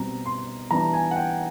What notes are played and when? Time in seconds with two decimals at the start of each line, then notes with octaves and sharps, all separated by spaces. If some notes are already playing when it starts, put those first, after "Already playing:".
Already playing: B2 G3 C4 A#5
0.26 C6
0.71 E3 G3 B3 D4 A#5
0.93 G#5
1.11 F#5
1.16 G5